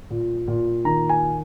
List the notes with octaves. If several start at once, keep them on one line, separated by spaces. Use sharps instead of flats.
A#2
A#2
D#3 A#5
G#5